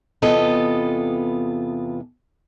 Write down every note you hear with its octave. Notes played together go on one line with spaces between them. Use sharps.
E2 C3 B3 F4 A4 D#5